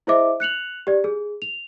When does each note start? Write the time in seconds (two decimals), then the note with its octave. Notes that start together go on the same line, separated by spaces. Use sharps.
0.07 E4 G#4 C5 D#5 E5 D6
0.40 F#6 C#7 F7 F#7
0.87 G4 D5
1.04 G#4
1.42 F7